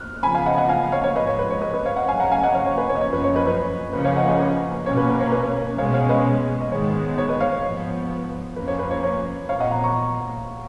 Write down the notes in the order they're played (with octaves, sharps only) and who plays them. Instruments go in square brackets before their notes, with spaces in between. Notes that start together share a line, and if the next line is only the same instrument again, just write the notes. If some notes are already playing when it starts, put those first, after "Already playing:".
Already playing: [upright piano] F6 F#6
[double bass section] C#3 F3 B3 [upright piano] G#5 B5
[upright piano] F5 G#5
D#5 F#5
D#5 F#5
F5 G#5
C#5 F5
C#5 F5
[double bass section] G#2 F3 G#3 [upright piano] B4 D#5
[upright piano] C#5
B4
C#5
B4 D#5
B4 D#5
C#5 F5
D#5 F#5
[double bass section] C#3 F#3 C#4 [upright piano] F5 G#5
[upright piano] F#5 A#5
F5 G#5
D#5 F#5
C#5 F5
C#5
B4
C#5
D#5
[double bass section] F#2 F3 A#3 C#4 [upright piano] C#5
[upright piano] B4
C#5
B4 D#5
B4 D#5
[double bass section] C#3 F3 A#3 C#4 [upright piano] B4
[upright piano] C#5 F5
D#5 F#5
B4 D#5
B4
[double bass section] B2 A#3 C#4 [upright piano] C#5
[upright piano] B4
B4
C#5
B4
[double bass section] B2 G#3 C#4 [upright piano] C#5 F5
[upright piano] C#5 F5
B4 D#5
D#5
[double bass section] G#2 D#3 G#3 B3 [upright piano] C#5
[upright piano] C#5
B4 D#5
C#5 F5
C#5
[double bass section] G#2 F3 B3
[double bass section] F2 F3 A#3 C#4 [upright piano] B4
[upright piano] C#5
B4
C#5
C#5
[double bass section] A#2 F3 B3 [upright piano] C#5 F5
[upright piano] D#5 F#5
F#5 A#5
A#5 C#6